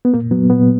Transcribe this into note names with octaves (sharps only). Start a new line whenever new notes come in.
B3
A#2 A#3
F#3 B3
A#2 B3